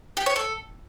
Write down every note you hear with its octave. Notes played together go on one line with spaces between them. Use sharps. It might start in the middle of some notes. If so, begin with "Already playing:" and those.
G4
C#5
A4